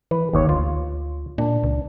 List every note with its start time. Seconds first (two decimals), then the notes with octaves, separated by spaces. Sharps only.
0.11 E3 B4
0.33 G1 D#2 C#5
0.49 D2 F4
1.38 A#2 D4
1.64 C#2